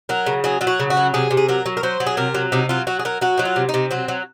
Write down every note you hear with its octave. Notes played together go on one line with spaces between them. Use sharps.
F#3 A#4
C#3
F#3 G#4
F#3 F4
F#4
C#3
F#4
F#3
C3 G#4
C3
G#4
F#3 A#4
F#3
A#4
F#3 C5
F#3
G#4
C3 A#4
F#3
C3 D#4
F#3 F4
F#3 F#4
G#4
F#3 A#4
F#3 F#4
F#3 D#4
F4
C3
D#4
C3
F#3 C4
F#3